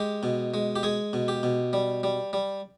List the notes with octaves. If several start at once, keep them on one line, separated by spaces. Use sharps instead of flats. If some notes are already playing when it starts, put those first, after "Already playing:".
Already playing: G#3 G4
B2
G#3
G4
G#3 G#4
B2
G4
B2
G3
G3
G3